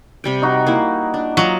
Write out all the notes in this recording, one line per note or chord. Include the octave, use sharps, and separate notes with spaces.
C3 G3 G5
D#4 F#4
A#3 E4
D4
F#3 F4 D#5